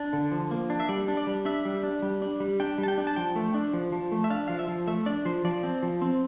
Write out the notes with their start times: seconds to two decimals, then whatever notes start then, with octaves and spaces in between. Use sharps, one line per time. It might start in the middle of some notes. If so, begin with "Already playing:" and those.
Already playing: D4
0.13 D3
0.32 F3
0.51 A#3
0.70 D4
0.80 E5
0.89 G3 D5
1.08 D4
1.17 D5
1.27 G3
1.45 D4 E5
1.65 G3
1.83 D4
2.02 G3
2.22 D4
2.40 G3
2.60 D4 G5
2.78 G3
2.83 A5
2.88 G5
2.98 D4
3.07 A5
3.16 F3 G5
3.36 A3
3.54 D4
3.73 F3
3.92 F3
4.12 A3
4.24 E5
4.30 D4 F5
4.48 F3 F5
4.59 E5
4.68 F3
4.87 A3 E5
5.06 D4 D5
5.25 F3 C5
5.45 F3 D5
5.63 C4
5.83 F3
6.01 C4